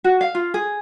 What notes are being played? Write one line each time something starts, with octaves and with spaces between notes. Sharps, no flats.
F#4
F5
F4
G#4